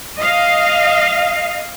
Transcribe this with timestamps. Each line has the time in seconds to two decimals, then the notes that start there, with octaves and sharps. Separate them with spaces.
0.19 D#5 F5